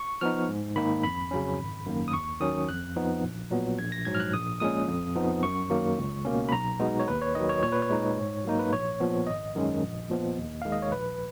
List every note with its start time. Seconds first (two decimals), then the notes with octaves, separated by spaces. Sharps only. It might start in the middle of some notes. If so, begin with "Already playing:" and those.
Already playing: C#6
0.21 F3 B3 D#4 F6
0.48 G#2
0.76 D#3 A#3 D#4 B5
1.03 F2 B5
1.31 C#3 F#3 C#4
1.59 G#1
1.86 F#2 D#3 A#3
2.08 D#6
2.13 D#2 C#6
2.40 D#3 F#3 C#4 D#6
2.69 F2 F#6
2.96 F3 B3 D#4
3.23 A#1
3.51 A#2 F#3 B3
3.78 A#1 G#6
3.92 A#6
4.05 G#2 F#3 G#6
4.15 F6
4.20 F#6
4.33 A#1 D#6
4.60 A#2 G#3 C#4 D#6
4.87 F2
5.16 F3 B3 D#4
5.43 F#2 C#6
5.70 D#3 F#3 A#3
5.98 C#2
6.25 B2 A#3 C#4
6.49 B5
6.52 B1 A#5
6.80 B2 G#3 B3 D#4
7.00 C#5
7.08 D#2 B4
7.22 C#5
7.35 D#3 F#3 D#5
7.49 C#5
7.63 A#2 C#5
7.72 B4
7.82 C#5
7.90 G#3 D#4
8.17 G#2
8.44 F#3 A#3 D#4
8.59 B4
8.72 A#1 C#5
9.00 A#2 F3 B3
9.27 G#1 D#5
9.55 F#2 D#3 G#3 C#4
9.82 A#1
10.10 A#2 F3 B3
10.37 D#2
10.62 D#3 G#3 F5
10.72 D#5
10.82 C#5
10.92 A#1 B4